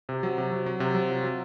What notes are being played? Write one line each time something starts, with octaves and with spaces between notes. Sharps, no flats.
C3
F#3
C3
F#3
F#3
C3
F#3
F4
F#3